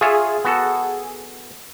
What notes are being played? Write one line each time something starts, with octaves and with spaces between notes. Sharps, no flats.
F4 G#4 C#5 E5
B3 F#4 A4